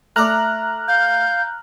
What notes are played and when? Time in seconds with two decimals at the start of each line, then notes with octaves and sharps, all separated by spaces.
0.16 A3 A4 D5 A#5 F6 F#6
0.88 F5 G6